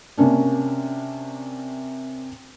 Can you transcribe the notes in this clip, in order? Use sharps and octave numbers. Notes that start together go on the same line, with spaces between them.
C3 A#3 C#4 D4